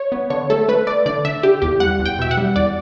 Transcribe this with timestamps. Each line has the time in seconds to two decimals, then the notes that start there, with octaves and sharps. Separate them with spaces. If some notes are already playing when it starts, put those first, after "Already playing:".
Already playing: C#5
0.12 B3
0.30 D3 C#5
0.50 A3 A4
0.68 A3 B4
0.87 A3 D5
1.06 D3 D5
1.25 D3 E5
1.43 D3 G4
1.62 E2 G4
1.80 G3 F#5
2.00 E2
2.05 G5
2.19 B2 E5
2.31 F#5
2.37 G3
2.56 E2 D5